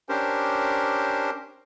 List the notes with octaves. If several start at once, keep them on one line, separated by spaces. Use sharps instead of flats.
C#4 D4 G4 A#4 C5